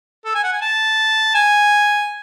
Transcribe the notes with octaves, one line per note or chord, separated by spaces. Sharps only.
A4
G#5
F#5
G#5
A5
G#5